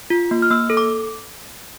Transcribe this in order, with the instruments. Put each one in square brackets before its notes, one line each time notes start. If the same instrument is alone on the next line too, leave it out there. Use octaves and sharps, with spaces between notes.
[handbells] F4
A#3
F6
A#3 E6
A4
D6